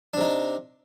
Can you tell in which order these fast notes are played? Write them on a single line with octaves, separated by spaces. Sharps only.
D4 C3 D#4